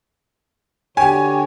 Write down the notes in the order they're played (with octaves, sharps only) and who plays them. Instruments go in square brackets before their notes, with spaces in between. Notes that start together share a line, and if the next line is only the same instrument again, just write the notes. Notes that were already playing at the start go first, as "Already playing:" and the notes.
[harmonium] D3 F#4 C#5 [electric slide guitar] G4 [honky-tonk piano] G#5